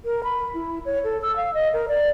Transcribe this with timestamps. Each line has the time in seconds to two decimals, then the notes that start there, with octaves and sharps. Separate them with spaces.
0.05 A#4
0.24 B5
0.54 E4
0.85 C#5
1.04 A4
1.22 E6
1.36 F5
1.54 D#5
1.73 A#4
1.88 D5